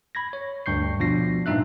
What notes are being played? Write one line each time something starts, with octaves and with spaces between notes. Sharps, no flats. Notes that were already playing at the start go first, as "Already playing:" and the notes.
B5 G#6 A#6
C#5
D2 G2 C#6 G6 C7
B2 F3 D4 F4 A#6 C7
G2 A#2 D#4 E5 F#6